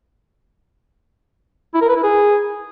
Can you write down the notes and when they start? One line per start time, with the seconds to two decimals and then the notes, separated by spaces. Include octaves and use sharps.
1.74 E4
1.82 A#4
1.89 B4
1.96 E4
2.03 G#4